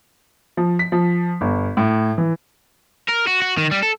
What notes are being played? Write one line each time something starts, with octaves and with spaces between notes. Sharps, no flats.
F3
B6
F3
G1
A2
E3
A#4
F#4
F#4
D#3
G3
A4